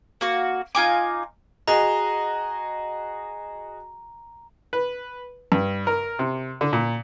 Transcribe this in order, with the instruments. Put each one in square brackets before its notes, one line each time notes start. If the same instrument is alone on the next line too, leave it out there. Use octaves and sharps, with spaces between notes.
[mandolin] A#3 F#4
D#4 F4 G#5 D6
[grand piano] F#4 G#4 D#5 [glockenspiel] A#5
[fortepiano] B4
G2
A#4
C3
D3
A#2